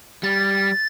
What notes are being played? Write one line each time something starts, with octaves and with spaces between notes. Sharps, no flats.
G3 A6